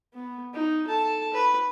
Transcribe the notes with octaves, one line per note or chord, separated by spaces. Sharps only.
B3
D#4
A4 A5
B4